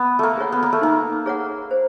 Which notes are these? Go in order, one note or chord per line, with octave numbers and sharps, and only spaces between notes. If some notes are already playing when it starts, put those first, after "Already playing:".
Already playing: B3
A3 A#3
G#4 C#5 F#5
B3
A#3
A3
A#3 D#4
G#4 C#5 F#5
C5